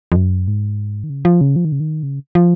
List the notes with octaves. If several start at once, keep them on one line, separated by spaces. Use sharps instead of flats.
F2
F#2
G#2
D#3
C#3
F3
C#3
F3
D#3
C#3
D#3
C#3
F3